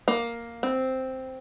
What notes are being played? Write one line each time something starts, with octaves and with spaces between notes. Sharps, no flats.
A#3
C4